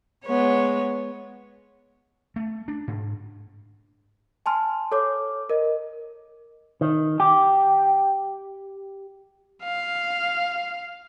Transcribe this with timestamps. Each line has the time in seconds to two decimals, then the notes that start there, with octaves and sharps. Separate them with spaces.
0.25 G#3 B3 C#5
2.36 A3
2.68 D4
2.88 G#2
4.46 G#5 A5 C6 F6
4.92 A4 C#5 D6
5.50 A#4 D#5
6.81 D#3
7.20 G4
9.64 F5